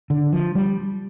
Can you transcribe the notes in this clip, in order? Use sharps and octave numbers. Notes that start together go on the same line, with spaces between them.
D3
F3
G3